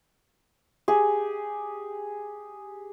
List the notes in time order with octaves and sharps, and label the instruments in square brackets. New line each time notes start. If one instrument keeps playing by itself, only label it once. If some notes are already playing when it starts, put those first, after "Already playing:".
[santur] G4 G#4